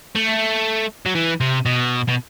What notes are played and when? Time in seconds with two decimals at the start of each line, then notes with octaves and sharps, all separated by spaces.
0.15 A3
1.06 F#3
1.15 E3
1.41 C3
1.66 B2
2.09 B2